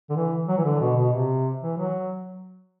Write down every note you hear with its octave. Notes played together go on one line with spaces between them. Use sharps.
D3
E3
F#3
E3
D3
B2
B2
C3
E3
F#3